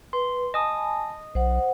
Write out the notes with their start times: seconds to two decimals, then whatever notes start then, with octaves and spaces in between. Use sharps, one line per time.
0.13 B4 C6
0.54 D#5 G#5 A5 B5 D#6
1.35 B1 C5 F#5